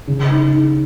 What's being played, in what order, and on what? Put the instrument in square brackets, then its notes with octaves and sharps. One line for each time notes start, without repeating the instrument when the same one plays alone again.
[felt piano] C#3
D#4
D#4